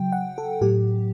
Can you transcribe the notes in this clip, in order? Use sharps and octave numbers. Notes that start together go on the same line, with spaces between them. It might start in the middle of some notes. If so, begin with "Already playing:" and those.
Already playing: C#3 F#3 G5
F#5
A4
A2 F#3 G4